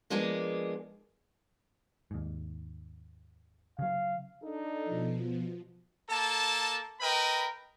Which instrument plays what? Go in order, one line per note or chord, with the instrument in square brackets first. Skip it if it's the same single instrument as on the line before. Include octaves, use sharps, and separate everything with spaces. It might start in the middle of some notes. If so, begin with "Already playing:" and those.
[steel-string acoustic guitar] F3 G#3 A#3 B3 D4 G#4
[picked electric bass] D#2 G#2
[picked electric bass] C#3 F#3 [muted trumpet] F5
[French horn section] D4 D#4 A4
[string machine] B2 F3
[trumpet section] A#3 A4 A5
A#4 B4 D#5 G5 B5